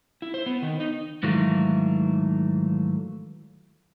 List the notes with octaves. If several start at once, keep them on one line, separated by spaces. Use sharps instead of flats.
E4
C5
B3
D#3
D#4
G#2 D#3 E3 F#3 A3 F4